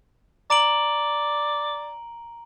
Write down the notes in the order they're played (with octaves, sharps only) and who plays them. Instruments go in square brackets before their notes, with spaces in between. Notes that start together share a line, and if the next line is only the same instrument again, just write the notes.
[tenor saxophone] D5 [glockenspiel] A#5 D7 F#7